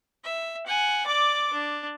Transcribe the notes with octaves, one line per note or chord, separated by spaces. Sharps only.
E5
F#5 G#5
D5 D6
D4